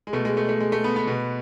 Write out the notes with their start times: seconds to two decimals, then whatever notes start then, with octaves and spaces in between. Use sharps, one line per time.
0.07 G#3
0.13 B2 A3
0.25 G#3
0.37 A3
0.49 A3
0.60 G#3
0.72 A3
0.84 B3
0.96 B3
1.07 B2